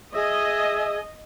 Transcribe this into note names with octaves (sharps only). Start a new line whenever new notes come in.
G#4 D#5 E5